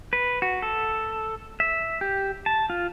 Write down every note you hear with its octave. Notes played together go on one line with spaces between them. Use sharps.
B4
F#4
A4
E5
G4
A5
F4